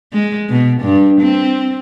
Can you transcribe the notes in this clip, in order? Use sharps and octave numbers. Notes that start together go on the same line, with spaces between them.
G#3
B2
G2
C4